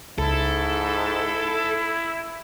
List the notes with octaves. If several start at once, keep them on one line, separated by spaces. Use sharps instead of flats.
C#2 G#2 E4 A4